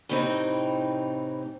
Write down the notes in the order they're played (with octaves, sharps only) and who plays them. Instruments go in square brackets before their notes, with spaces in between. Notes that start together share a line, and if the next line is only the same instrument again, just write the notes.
[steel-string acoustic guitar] A2 C3 E3 C4 D4 D#4